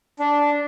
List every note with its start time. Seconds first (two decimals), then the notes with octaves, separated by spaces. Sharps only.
0.20 D4